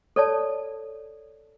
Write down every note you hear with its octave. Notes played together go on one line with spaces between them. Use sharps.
A4 C#5 D5 A5